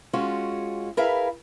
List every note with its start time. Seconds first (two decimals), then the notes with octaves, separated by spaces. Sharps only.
0.13 G#3 C#4 F4 F#4
0.97 E4 G#4 A#4 B4 E5 F5